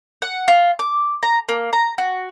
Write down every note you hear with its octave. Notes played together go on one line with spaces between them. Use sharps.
F#5
F4
D6
A#5
A#3
A#5
F#4